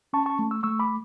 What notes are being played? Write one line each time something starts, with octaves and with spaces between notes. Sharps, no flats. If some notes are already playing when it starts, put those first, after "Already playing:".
C#4 A5 C#6
A5 C#6
A3
C#6 E6
A3 C#6 E6
B5 D6